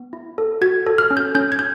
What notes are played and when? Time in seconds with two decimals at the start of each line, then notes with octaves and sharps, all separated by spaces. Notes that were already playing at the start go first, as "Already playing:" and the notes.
Already playing: B3
0.13 E4
0.38 A4
0.61 F#4 G#6
0.87 A4
0.98 F6
1.11 C#4
1.17 G6
1.35 C#4 G6
1.52 G#6
1.59 G6